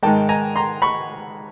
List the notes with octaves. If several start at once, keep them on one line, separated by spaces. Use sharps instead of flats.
G#2 D#3 G#3 G5 A5
G#5 A#5
A#5 C6
B5 C#6